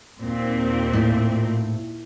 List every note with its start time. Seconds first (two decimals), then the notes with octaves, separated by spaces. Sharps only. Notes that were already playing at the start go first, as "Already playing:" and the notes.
0.23 D#2 A#2 C4
0.93 A2